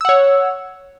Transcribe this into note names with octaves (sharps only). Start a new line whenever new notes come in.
C#5 F#5 E6